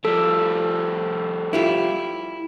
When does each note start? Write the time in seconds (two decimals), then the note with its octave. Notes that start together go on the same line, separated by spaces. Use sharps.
0.05 F3 G3 A4
1.53 E4 F4 G4